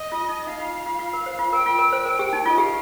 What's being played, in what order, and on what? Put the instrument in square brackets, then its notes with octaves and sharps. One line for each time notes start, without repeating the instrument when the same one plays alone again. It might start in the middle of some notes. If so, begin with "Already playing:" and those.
Already playing: [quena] D#5
[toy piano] F4
D#4
[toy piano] D#4 [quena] F5
[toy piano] F4
F4
F4
F4
A#4
C5
F4
[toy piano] A#4 [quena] G5
[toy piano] F4
A#4
C5
A#4
G4
D#4
[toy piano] F4 [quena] D#5
[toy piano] G4 [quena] F5